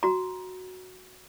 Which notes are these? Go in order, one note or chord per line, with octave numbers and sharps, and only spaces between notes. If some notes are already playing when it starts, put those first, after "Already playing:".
F#4 A#5